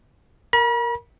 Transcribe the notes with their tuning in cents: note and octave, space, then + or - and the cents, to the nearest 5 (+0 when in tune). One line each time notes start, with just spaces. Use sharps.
A#4 +0 B5 -45